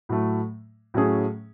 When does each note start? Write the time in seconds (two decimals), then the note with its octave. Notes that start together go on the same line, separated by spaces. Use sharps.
0.09 A2 F#3 A3
0.94 A2 F#3 A3 C#4 G#4